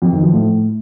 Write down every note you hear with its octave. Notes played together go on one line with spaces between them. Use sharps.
F2
D#3
F3
A2